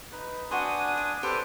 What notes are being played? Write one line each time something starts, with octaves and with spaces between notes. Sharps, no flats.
D#4 B4
D4 F#4 B4 C5 G#5 D#6
D5
G4 A4 B4 C5 D5